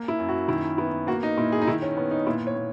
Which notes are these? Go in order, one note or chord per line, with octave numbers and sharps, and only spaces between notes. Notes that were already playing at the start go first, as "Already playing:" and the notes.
Already playing: A#3
E4
F#2
F#4
D#3 E4
B3 E4
A#3 F#4
D#4
A#2 E4
G#4
D#4
D#3 E4
C#4
B3 C#4
D#4
A#2 E4
C#5
A#2